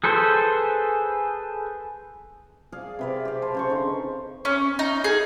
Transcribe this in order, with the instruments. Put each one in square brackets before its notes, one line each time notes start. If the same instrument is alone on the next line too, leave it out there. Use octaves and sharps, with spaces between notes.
[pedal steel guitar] G#4 A4 B4 C5 G#5
[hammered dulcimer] G#4 D5 F5
C3 B4 D5
G4 F5
C5 F5 G#5 A5
C#3 C5 C#6
D3 D#4
[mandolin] C#4
D#4
G#4